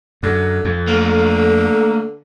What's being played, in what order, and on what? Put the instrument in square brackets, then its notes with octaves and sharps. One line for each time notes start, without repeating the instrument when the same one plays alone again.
[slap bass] F#2 [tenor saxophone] D3
[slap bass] F2
[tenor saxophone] D3 [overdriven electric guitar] A3 A#3